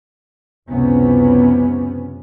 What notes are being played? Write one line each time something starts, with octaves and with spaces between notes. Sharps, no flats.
F#1 C#2 C3 B3 C#4